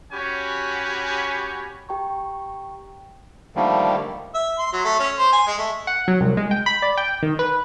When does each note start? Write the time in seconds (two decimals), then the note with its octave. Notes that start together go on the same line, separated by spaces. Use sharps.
0.13 C#4 F#4 G4 C#5 G#5 B5
1.89 G4 G5 A#5 C#6
3.56 D3 D#3 F3 G3 A3 A#3
4.34 E5
4.59 C6
4.73 F#3
4.85 A3
5.00 C#4
5.18 C5
5.32 G#5
5.47 G#3
5.58 A3
5.87 F#5
6.08 F#3
6.21 C2
6.37 G#3
6.51 G5
6.66 B5
6.82 D5
6.97 G5
7.23 D#3
7.39 B4